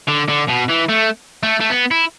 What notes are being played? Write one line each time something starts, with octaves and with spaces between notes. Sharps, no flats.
D3
D3
B2
E3
A3
A3
A3
B3
E4